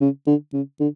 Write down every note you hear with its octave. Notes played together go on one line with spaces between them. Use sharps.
C#3
D3
C#3
D3